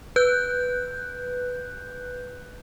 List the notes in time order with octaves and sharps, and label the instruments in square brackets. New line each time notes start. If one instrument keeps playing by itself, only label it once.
[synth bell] B4 F#6 G6